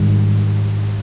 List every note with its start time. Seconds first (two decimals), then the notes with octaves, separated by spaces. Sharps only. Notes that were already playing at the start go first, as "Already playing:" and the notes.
Already playing: G#2 D#3 G3